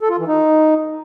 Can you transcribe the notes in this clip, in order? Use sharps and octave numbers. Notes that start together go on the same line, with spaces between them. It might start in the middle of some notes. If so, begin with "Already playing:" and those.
A4
F4
E3
D#4